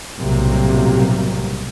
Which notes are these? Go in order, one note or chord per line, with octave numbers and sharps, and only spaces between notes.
B1 A2 C3 F#3 G3 A#3